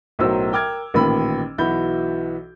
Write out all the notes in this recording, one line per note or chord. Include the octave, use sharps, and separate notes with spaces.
B1 A2 F#3 A#4 C5 E6
A#4 G5 D6 F6 G#6
A1 A#2 D#3 B5 E6
B1 E3 F#4 B5 G6